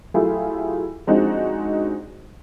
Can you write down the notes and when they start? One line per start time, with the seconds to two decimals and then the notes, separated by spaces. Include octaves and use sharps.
0.14 F#3 A3 E4 F4 G4 G#4
1.07 F3 G#3 C4 D4 D#4 F#4